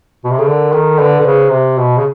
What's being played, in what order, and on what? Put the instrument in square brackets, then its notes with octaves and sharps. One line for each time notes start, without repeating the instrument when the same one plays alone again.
[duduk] B2
C3
[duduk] C#3 [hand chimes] A4
[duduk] D3 [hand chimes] A#4
[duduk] D#3 [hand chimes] A4
[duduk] D3 [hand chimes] B4
[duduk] D3
[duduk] C#3 [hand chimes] C5
[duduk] C3
B2
C#3